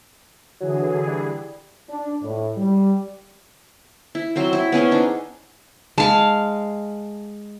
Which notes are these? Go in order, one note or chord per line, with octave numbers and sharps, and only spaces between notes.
D3 E3 F#3 G#4
G3
D4
A2
G3
E4
F#3 C4 C5
E4
B3 C#4 G#4 C5
D4 D#4
G#3 F5 A5